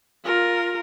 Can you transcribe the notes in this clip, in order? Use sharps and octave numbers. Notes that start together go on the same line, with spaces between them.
F4 A#4